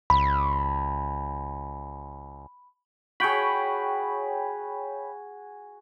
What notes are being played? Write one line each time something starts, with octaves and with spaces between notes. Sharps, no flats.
C#2 B5
F#4 G#4 C#5 G5 B5